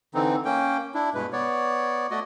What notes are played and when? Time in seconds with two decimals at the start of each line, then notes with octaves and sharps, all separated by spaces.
0.14 D3 E3 C4 D#4
0.45 A#3 C#4 G5
0.94 D4 E4
1.14 G2 B2 G#3 B4
1.33 B3 C#5 D5
2.11 A3 F#4 D5 D#5